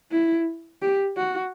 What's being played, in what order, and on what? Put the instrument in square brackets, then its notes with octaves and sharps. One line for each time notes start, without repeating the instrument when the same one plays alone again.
[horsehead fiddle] E4
G4
F#4